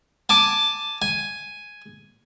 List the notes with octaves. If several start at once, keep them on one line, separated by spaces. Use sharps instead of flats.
G#5 A5 D6
G#5